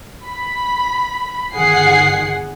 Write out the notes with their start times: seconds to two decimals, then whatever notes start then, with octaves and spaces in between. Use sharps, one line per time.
0.25 B5
1.54 G1 D#3 G#4 F#5 C7